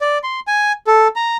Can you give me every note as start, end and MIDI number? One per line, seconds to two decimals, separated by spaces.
0.01 0.18 74
0.23 0.40 84
0.47 0.72 80
0.87 1.08 69
1.16 1.37 82